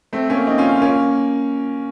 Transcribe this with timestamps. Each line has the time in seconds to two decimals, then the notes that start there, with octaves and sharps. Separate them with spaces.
0.13 A3 C4
0.30 A#3 C#4
0.47 C4 D#4
0.58 C#4 F4
0.82 A#3 C#4